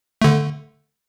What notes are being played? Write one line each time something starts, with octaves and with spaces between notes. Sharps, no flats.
D3 A3